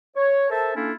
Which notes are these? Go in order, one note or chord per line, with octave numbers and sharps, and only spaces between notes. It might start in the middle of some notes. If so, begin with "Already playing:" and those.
C#5
A4 A#4 C5 E5 A5
A#3 C#4 D4 E4 F4 A4